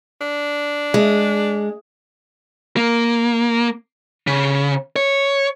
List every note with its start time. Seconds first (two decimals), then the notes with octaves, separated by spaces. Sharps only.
0.21 D4
0.94 G#3
2.77 A#3
4.27 C#3
4.96 C#5